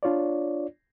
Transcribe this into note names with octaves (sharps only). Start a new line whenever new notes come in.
D4 F4 C#5 D5